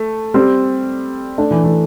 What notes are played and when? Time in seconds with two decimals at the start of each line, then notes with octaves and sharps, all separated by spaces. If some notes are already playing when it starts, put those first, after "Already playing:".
Already playing: A3
0.34 G3 C4
1.38 A3 D4
1.51 E3
1.63 E3 A3